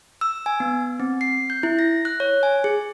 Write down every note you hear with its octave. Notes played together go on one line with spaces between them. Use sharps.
E6
G#5
B3
C4
C7
G6
E4
A#6
F#6
C#5
G#5
G#4